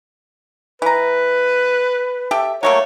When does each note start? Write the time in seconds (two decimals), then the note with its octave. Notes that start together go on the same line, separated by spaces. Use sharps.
0.82 E3 B4 A#5
2.31 G4 A4 E5
2.63 F#3 A3 A#3 C#5